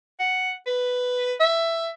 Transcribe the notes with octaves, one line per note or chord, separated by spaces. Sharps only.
F#5
B4
E5